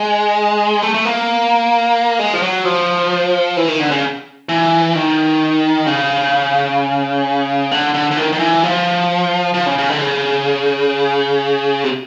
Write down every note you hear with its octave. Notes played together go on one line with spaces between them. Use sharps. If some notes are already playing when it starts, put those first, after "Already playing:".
Already playing: G#3
A3
A3
A#3
G#3
F3
F#3
F3
E3
D#3
D3
C#3
E3
D#3
C#3
D3
D3
D3
D#3
D#3
E3
F3
F3
C#3
C#3
D3
C#3
C3